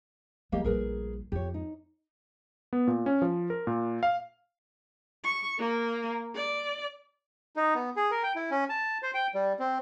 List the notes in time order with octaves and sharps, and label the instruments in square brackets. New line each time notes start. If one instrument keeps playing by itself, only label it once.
[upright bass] F3 G3 [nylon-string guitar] A#3 G4 D#5
[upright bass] A#1 G3 [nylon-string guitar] G#4 A#4 B4
[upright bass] F2 [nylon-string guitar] G4 C#5
[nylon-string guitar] D#4
[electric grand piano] B3
A#2
C#4
F3
A#4
A#2
F5
[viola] C#6
A#3 A#4
D5
[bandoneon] D#4
B3
G#4
A#4
G5
E4
C#4
A5
C5
G5
G3
C4